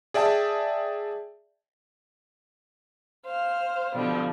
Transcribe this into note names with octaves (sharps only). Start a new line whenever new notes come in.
G#4 D5 E5 G5 A5
C5 F5
B2 D3 F3 G3